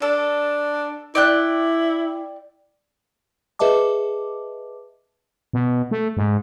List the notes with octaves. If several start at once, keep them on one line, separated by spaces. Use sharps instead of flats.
D4 A4
E4 D5 G5 F#6
G#4 B4 D#5 E5 A5 D6
B2
A3
G#2